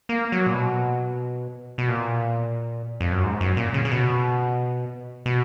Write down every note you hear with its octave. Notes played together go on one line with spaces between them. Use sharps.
A#3
F#3
A#2
B2
B2
A#2
F2
F#2
G#2
F#2
A#2
C#3
C#3
B2
B2